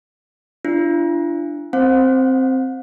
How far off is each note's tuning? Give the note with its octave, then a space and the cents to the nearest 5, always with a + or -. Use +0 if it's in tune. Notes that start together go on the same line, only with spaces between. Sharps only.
D4 +0 F4 -45
C4 +0 C5 +0 F#5 -45